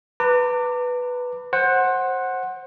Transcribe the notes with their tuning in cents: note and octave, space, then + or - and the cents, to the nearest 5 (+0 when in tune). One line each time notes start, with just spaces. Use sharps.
B4 +0 A#5 -45 D6 +5
C5 +20 F#5 +0